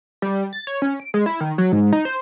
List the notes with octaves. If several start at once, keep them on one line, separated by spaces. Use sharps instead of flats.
G3
A6
C#5
C#4
D7
G#3
E4
D#3
F#3
G#2
D#4
C5